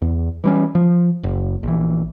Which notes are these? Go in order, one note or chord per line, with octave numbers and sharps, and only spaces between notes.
E2
E3 G3 C#4
F3
F#1
A#1 E3